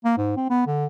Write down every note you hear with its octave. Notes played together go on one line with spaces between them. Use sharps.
A#3
G#2
C4
B3
D3